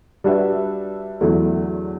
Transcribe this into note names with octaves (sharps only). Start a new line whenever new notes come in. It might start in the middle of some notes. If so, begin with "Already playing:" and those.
G3 D4 F#4 B4 E5
E2 D3 F#3 A3 E4